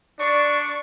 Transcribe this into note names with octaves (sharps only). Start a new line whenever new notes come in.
D4 D5 C#6